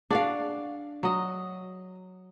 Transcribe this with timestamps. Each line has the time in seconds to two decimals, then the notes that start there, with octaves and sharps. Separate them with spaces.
0.10 D4 F#4 G#4 D5 F5
1.03 F#3 D#5